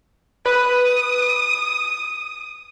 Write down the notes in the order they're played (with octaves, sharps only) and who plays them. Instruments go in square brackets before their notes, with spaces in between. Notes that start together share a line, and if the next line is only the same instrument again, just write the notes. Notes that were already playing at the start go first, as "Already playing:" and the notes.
[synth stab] B4 [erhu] D#6